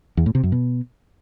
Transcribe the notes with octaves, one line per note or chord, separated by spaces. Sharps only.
E2
A2
C3
F#2
B2